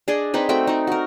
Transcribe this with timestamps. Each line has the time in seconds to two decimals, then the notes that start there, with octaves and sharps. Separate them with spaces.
0.08 D4 G#4 D5 D#5
0.34 C4 D#4 B4
0.49 A3 C4 F#4 G5
0.67 A3 D#4
0.87 F#4 A#4